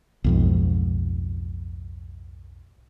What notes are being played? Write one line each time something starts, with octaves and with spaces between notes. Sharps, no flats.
B1 F2 G#2